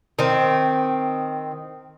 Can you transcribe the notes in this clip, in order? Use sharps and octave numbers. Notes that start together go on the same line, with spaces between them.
D#3 C4